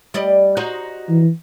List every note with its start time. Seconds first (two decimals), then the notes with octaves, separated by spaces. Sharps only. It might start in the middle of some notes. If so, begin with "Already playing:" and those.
0.14 G3 D5 D#5
0.57 D#4 F#4 C5
1.09 E3